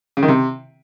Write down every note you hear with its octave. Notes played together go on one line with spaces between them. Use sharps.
C#3
D#3
C3